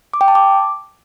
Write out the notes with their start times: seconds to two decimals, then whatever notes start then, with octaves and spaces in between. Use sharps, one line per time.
0.14 D6
0.21 G5
0.28 A5
0.35 D6